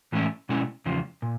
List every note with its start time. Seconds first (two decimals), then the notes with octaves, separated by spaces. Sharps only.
0.12 A2 E3 G#3 C#4 E4
0.49 B2 G#3 C#4 E4
0.86 E2 C#3 F3
1.22 A#2